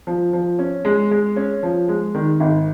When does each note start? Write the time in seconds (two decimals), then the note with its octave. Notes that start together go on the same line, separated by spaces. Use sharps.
0.07 F3
0.33 F3
0.59 C#4
0.85 G#3
1.11 G#3
1.36 C#4
1.63 F3
1.88 G#3
2.15 D#3
2.40 G#1